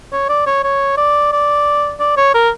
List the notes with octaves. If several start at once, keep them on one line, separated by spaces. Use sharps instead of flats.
C#5
D5
C#5
C#5
D5
D5
D5
C#5
A#4